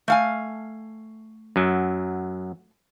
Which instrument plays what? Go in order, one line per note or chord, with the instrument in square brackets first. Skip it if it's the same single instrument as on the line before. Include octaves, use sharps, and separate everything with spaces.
[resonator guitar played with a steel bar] A3 F5 G#5
[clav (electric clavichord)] F#2 F#3